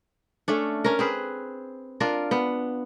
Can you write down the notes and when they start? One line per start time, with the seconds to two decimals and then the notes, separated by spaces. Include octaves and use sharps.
0.48 A3 C#4 D4
0.84 C#4 A#4
0.99 C4 G#4 B4
2.00 D4 F4 A#4
2.31 B3